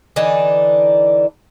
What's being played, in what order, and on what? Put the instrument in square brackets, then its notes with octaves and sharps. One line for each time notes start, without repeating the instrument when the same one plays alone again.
[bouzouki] D3 E3 D4 D#4